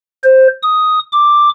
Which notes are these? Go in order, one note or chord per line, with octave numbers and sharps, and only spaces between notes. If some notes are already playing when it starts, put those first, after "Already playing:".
C5
D#6
D6